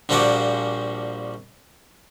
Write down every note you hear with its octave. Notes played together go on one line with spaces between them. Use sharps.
A#1 A#2 F3 G3 F#4 D5